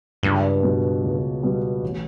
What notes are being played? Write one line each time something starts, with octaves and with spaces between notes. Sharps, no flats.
C#2 G2
B2 G3 B3
C#2
B2 G3 B3
A1